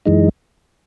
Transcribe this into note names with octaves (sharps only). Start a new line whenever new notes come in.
F#2 E3 G#3 D#4